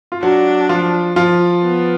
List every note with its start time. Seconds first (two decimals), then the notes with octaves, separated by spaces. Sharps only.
0.12 F4
0.22 F#3 D4 F#4
0.69 F3 F4
1.16 F3 F4
1.63 B3